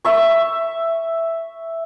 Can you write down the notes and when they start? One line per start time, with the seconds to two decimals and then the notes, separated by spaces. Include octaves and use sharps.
0.05 E5 C#6